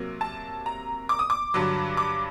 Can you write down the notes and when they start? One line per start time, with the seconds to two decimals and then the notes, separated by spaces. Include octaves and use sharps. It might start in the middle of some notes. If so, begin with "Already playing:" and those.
Already playing: C3 F#3 A#3
0.21 A5
0.66 A#5
1.09 D6
1.19 D#6
1.30 D6
1.54 G2 D3 F#3
1.97 D6